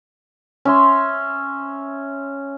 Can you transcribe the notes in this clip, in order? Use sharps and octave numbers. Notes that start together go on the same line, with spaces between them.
C#4 E5 C6